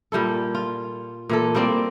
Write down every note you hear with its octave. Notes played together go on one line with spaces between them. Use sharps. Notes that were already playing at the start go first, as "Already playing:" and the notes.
A#2 G3 E4 A4
F4
A#2 E3 A4
G3 A#3 C4 D5